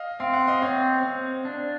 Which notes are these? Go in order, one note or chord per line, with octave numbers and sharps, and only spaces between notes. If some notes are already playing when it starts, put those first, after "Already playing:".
Already playing: D#5 F5
C4 F5
F#5
D#5 F5
C4 C#5 D#5
C4
D4